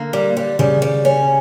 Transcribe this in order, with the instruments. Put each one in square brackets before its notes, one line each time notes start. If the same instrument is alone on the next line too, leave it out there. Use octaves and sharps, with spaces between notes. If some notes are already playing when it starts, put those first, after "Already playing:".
Already playing: [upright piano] D3 [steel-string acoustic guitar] A#3
[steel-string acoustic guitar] G3
G3
[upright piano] C#3 [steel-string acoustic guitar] G3
[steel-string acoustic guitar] G3
C#4